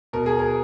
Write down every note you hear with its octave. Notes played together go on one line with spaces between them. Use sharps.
B2 A#4
G#4
A#4